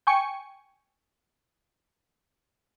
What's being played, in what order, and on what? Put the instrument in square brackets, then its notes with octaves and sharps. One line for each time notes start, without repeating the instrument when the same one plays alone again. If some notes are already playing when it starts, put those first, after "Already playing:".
[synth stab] G5 G#5 C#6 C#7